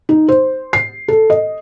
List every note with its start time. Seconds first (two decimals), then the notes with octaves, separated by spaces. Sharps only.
0.09 D#4
0.28 C5
0.73 C7
1.08 A4
1.30 D#5